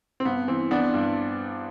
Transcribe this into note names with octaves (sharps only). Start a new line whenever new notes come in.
C4
G2 B3
E3 C4
E3 B3 D4
G2